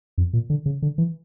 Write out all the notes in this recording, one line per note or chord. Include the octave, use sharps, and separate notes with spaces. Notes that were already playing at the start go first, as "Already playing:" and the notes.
F2
A#2
D3
C#3
D3
E3